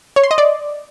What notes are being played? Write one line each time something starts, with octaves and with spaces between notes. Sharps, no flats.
C#5
C6
D#5
D5